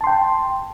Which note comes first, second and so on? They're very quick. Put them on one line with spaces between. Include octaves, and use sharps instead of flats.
A5 C6 G5